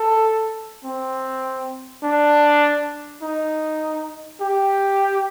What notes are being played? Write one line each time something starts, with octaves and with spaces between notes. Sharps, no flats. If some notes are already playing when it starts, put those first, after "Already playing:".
Already playing: A4
C4
D4
D#4
G4